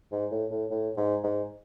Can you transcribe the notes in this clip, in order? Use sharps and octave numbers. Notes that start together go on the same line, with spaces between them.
G#2
A2
A2
A2
G#2
G#2